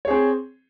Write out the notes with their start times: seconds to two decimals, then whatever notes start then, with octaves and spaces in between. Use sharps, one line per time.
0.05 C#5
0.08 G#4
0.10 C4